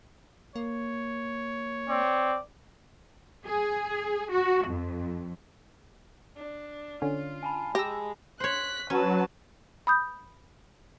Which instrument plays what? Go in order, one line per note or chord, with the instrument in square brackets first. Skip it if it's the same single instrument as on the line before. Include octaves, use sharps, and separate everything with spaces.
[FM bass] A#3 [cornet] C#5
[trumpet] C4 [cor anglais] D5
[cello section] G#4
F#4
F2
[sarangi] D4
[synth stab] D3 C#4 [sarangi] F4
[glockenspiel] G#5 A5 B5
[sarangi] G#3 [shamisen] G4 [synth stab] E6 A#6
[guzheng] C5 C#5 [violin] F#6 B6
[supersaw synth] F#3 [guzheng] C#4 [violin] B4 A5
[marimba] B5 D#6 G6